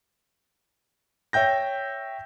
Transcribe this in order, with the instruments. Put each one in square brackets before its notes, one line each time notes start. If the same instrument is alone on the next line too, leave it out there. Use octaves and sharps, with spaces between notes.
[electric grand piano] C#5 E5 G5 G6 A#6